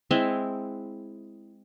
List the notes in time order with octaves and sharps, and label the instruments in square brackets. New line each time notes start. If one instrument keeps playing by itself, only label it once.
[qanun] G#3 C4 E4 E5